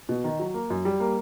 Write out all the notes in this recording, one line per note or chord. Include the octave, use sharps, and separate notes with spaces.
B2
D#3
F#3
A#3
F#2
G3
A#3